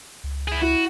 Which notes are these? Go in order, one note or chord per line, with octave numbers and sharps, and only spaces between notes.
C#2
E4 G#4
E4 F#4